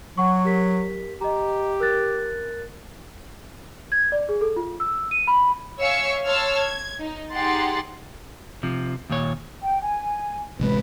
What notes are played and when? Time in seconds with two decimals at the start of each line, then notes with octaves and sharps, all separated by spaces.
0.17 F#3 F#5 C#6
0.45 G4 A#4 B6
1.21 G4 D#5 A#5
1.80 A#4 F#6 A6
3.92 G#6
4.12 D5
4.29 G#4
4.41 A4
4.56 F4
4.80 E6
5.11 D#7
5.27 B5
5.80 C#5 E5 F5 G#5 C#6 E6
6.26 C#5 A5 C6 E6 F6 G#6
6.56 G#6
7.00 D#4
7.31 D#4 G4 G#4 F#5 C6 A6
8.63 C3 F3
9.10 D#2 A#2 C#5
9.62 G5
9.82 G#5
10.60 A1 C3 G#3 B4